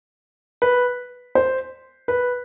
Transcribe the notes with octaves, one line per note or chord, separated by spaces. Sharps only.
B4
C5
B4